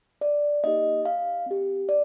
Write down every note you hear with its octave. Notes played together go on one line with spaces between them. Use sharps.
D5
A#3 D#4 G4 D#5
F5
C4 G4
D5